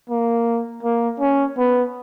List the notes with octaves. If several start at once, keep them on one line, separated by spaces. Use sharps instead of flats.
A#3
A#3
C#4
B3